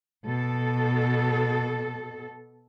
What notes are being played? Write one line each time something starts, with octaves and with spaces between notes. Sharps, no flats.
B2 A4